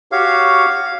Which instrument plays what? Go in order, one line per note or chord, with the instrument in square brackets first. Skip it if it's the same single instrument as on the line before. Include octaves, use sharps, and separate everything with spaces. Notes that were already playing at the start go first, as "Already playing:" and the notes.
[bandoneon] F#4 G4 C#5 [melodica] F5